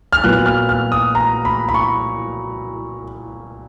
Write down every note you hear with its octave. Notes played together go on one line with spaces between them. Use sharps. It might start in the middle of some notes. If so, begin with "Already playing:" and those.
F6
A#2 F#3 B3 F#6
F6
F6
D#6
A#5
B5
B5
C#6